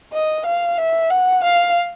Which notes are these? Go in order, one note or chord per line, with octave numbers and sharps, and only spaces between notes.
D#5
F5
E5
F#5
F5